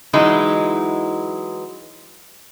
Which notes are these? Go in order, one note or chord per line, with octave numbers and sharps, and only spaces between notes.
E3 F#3 G#3 D#4 E4